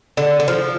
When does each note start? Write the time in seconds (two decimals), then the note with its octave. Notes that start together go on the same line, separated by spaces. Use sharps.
0.17 D3
0.40 D3
0.48 F3